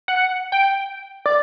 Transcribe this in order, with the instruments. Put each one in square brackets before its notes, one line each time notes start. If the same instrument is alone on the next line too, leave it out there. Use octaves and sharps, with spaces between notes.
[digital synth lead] F#5
G5
D5